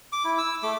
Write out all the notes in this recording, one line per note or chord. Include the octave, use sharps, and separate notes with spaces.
D6
E4
E6
A3 D6